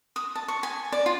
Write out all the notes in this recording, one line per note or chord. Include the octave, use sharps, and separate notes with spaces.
D#6
A5
C#6
G#5
D5
F4